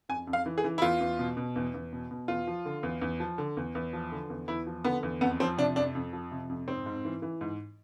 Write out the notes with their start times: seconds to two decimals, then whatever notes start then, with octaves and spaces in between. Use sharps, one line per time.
0.09 F2 G#5
0.27 F2
0.33 F5
0.46 E3
0.58 G#4
0.64 E3
0.78 E4
0.82 E2 F4
1.00 E2
1.19 B2
1.37 B2
1.56 E2
1.74 E2
1.93 B2
2.11 B2
2.28 E2 F4
2.47 F3
2.65 D3
2.83 E2
3.02 E2
3.20 F3
3.38 D3
3.57 E2
3.75 E2
3.93 F3
4.12 D3
4.30 E2
4.48 E2 E4
4.67 F3
4.85 D3 B3
5.03 E2
5.21 F2 B3
5.40 F3 C4
5.57 C3 D4
5.76 F2 D4
5.95 F2
6.13 F3
6.31 C3
6.50 F2
6.68 G#2 C4
6.86 G#2
7.05 E3
7.22 E3
7.41 G#2